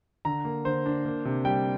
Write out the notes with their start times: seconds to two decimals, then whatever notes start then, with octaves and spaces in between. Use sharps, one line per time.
0.25 D3 A#5
0.45 A#3
0.65 D3 C5
0.86 D4
1.05 A#3
1.25 C3
1.45 G3 G5